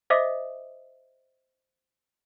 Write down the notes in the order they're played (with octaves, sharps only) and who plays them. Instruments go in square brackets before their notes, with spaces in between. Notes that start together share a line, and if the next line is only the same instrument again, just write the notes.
[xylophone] C5 D#5 E5 D6 D#6 B6